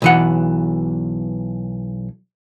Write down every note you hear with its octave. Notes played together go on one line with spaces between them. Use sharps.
B1 E3 F#5